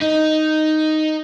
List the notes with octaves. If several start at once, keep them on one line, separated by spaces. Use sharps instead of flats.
D#4